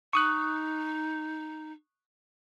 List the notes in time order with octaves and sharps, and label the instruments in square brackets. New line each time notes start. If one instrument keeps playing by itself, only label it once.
[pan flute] D#4 [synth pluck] C#6 D#6 F#6